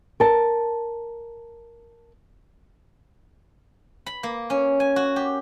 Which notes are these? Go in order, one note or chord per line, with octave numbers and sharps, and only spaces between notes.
A#4 A5
B5
A#3
C#4
G#5
F#4
G4